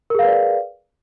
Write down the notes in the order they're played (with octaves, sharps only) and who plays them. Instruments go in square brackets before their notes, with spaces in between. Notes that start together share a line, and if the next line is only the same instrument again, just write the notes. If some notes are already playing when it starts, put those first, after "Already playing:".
[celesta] A#4
G#4
F5
B4
D5